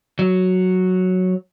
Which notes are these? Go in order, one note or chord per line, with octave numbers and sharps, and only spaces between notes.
F#3